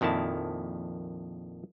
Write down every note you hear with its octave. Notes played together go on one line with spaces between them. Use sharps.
A#1 F2 D#3 E4 A5